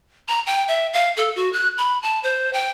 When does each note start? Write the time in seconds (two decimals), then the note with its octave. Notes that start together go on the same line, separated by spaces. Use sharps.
0.28 A#5
0.46 G5
0.68 E5
0.93 F5
1.17 A4
1.36 F#4
1.53 F#6
1.78 B5
2.03 A5
2.23 C5
2.53 G5